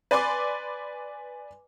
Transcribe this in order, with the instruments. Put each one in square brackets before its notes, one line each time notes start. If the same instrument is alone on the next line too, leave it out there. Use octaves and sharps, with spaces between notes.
[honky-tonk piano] B4 D5 G#5 C6 D6